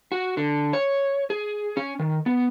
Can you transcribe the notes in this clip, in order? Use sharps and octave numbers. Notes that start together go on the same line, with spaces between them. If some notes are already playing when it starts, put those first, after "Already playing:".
F#4
D3
C#5
G#4
C#4
D#3
B3